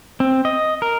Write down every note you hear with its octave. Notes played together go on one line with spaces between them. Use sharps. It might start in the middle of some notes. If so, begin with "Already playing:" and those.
C4
D#5
A#4